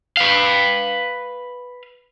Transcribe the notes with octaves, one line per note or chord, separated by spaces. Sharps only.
B4 F5